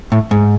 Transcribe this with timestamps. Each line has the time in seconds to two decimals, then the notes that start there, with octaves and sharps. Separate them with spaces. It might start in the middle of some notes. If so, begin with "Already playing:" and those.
0.12 A2
0.31 G#2